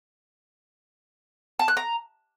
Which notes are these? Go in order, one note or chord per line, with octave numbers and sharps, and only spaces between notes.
A5
F#6
A#5